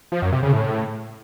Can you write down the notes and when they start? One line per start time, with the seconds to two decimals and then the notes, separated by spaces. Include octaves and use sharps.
0.12 F3
0.22 F#2
0.32 C3
0.43 C#3
0.53 A2